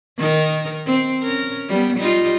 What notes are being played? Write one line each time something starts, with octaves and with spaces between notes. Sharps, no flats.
D#3 D#4 A#4
C4
C#4 A#4
G3 B3
G3 D#4 F4